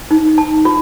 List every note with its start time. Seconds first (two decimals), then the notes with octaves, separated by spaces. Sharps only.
0.11 D#4
0.38 A5
0.65 F4